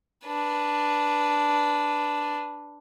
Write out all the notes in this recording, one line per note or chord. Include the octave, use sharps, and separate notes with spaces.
D4 B4